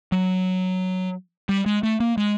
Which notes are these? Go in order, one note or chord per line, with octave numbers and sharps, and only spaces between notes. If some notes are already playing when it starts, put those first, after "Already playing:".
F#3
G3
G#3
A3
A#3
G#3